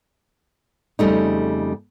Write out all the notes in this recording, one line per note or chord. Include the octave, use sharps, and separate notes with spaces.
F2 C#3 G3 A3 D#4